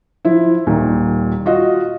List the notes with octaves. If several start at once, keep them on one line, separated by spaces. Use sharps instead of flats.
F3 E4
D#1 A#2 D#3
F4 F#4 D#5